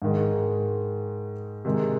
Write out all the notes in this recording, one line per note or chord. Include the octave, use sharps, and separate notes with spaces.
G#2 D#3 G#3
C3 D#3 G#3